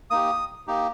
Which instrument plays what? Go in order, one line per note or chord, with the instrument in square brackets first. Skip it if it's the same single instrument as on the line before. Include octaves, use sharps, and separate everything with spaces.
[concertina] A#3 D#4 G4 D#6
A#3 D#4 G4